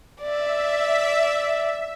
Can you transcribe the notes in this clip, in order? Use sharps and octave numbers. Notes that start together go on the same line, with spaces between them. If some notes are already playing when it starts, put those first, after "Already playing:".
D5 E5